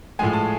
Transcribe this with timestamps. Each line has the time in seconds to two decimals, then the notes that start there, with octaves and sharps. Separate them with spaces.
0.19 A2 F3 G#3 G#5
0.33 A5